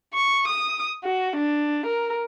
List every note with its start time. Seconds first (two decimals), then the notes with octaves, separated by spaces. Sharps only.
0.14 C#6
0.47 D#6
1.04 F#4
1.37 D4
1.86 A#4